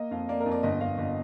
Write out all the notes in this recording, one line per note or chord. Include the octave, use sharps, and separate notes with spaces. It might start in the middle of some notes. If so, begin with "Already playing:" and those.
Already playing: A#3 D#5
F2 F5
A#3 D5
A#4
F2
D5
G1 D#5
G1 F5
G1